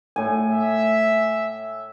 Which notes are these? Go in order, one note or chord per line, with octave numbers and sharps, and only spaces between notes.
A2 G#5
E5